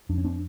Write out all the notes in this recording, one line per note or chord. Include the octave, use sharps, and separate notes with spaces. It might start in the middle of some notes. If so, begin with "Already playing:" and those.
F2 D4
C#4
C4 D4